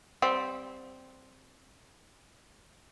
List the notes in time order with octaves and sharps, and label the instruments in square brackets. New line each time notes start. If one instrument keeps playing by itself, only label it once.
[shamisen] G3 C4